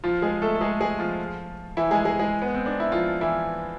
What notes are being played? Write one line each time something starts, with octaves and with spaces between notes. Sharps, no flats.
F3 F4
G#3 G#4
A3 A4
A4
G#3 G#4
G#3 G#4
F3 F4
E3 E4
G#3 G#4
G#3 G#4
G#3 G#4
B3
C4
D4
E4
F3 F4
E3 E4